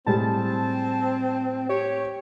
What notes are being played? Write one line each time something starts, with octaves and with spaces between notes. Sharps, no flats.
A2 G3 G#3 C4 A5
G4 C#5